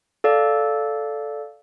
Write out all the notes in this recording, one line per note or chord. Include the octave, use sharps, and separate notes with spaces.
A4 D5 F5